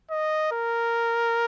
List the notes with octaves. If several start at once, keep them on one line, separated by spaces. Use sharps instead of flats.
D#5
A#4